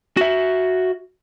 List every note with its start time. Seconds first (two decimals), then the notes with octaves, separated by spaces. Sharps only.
0.17 F#4 E5